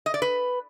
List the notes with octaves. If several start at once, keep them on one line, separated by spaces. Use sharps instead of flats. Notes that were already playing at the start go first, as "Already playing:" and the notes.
D#5
D5
B4